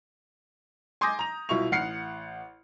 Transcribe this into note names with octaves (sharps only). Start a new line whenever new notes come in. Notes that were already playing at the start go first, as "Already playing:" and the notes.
G#5 C6 D6 D#6 G6 A#6
A#5 F7
C2 B2 E4 F4 C#6 F7
A1 F#5 F6 C7